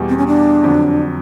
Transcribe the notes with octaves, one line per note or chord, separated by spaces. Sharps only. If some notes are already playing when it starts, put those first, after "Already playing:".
Already playing: E2 B2 G3
C4
C#4
D4
F2 D3 F#3